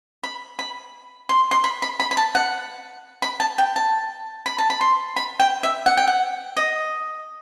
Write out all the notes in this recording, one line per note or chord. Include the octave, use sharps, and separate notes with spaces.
B5
B5
C6
C6
B5
B5
B5
B5
A5
F#5
B5
A5
G5
A5
B5
A5
B5
C6
B5
G5
E5
F#5
G5
F#5
D#5